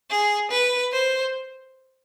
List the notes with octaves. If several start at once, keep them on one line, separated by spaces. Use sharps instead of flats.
G#4
B4
C5